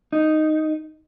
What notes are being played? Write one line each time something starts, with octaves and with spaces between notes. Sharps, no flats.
D#4